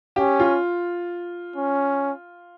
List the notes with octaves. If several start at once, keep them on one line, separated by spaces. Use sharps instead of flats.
C#4 G4
F4
C#4